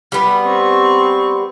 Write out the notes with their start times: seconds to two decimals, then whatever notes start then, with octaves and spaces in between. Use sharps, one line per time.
0.12 G3 B3
0.45 C4 C#6